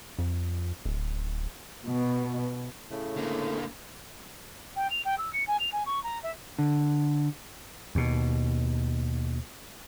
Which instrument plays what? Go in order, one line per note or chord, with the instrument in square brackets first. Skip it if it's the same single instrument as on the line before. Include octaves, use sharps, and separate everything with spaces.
[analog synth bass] F2
D1
[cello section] B2
[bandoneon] A2 C#3 A3
[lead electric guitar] D3 A#3
[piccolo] G5
F7
G5
E6
C#7
G#5
F7
G#5
C#6
A#5
E5
[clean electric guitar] D3
[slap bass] D#2 B2